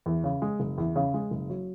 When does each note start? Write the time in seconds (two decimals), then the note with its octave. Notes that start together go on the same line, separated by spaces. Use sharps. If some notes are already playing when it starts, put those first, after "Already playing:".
0.06 E2
0.24 C#3
0.42 G#3
0.60 F#1
0.78 E2
0.96 C#3
1.14 G#3
1.31 F#1
1.50 F#3